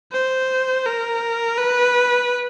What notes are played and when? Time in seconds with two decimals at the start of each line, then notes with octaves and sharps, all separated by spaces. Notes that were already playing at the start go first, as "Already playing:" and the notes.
0.12 C5
0.86 A#4
1.58 B4